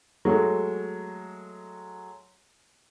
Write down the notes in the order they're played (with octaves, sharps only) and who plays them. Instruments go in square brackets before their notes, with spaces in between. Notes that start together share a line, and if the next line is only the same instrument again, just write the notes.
[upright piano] F#3 G#3 A3